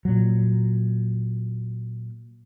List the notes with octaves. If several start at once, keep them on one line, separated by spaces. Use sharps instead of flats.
A#2 F#3